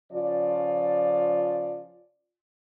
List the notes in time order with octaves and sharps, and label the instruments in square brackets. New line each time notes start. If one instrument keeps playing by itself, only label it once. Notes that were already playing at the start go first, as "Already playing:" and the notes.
[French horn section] C#3 F3 F4 D5